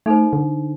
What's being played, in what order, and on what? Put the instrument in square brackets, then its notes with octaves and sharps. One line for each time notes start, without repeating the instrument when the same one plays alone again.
[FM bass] A3 [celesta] D#4 A4 C5
[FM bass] D3